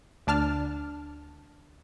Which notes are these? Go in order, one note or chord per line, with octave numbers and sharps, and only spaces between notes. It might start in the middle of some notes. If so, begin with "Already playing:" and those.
D2 D4 A5 F6